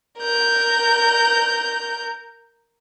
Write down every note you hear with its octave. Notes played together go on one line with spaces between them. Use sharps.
A#4 G6